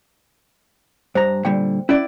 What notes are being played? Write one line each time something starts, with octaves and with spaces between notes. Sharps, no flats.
G2 C5 A#5
A#2 D3 G3 G5
C#4 E4 D5